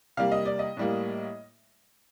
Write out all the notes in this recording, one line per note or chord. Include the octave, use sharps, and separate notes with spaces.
C3 G3 A#3 F5
D#5
D5
D#5
A2 G3 A#3